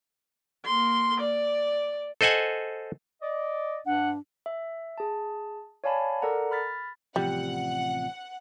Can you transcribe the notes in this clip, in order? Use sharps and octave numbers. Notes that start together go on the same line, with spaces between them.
A#3 C6
D5
A4 C5 D#5 F#5 G#5
D5 D#5
G2 D4 F#5
E5
G#4 A5
C#5 D5 F5 G#5 A5 B5
A4 A#4 D5 F#5 A#5
B5 F6 A6 B6
A1 C3 F3 G3 F#5